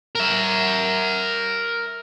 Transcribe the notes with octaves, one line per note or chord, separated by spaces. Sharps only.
A#4 E5